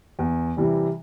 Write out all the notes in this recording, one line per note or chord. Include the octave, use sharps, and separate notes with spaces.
E2
C3 E3 G3